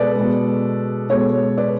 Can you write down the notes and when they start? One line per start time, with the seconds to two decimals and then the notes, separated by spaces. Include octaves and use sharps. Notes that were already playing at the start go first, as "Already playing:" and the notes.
Already playing: B2 G#3 A4 B4 D5
0.15 B2 G#3
1.10 B2 G#3 A4 C#5
1.58 B4 D5